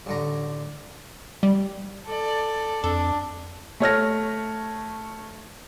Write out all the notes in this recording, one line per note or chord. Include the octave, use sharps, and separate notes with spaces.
A1 D3 A#5
G3
A4 D5
F2 D4 A4
A3 C#5 F6 A#6